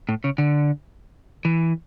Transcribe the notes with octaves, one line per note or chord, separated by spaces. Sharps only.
A2
C#3
D3
E3